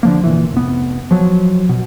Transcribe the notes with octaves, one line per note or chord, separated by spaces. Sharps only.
D3 F3 A#3
F1 A#2 E3
F1 B3
F3 F#3
B2